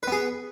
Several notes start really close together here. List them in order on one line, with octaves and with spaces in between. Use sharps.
B4 B3 G#4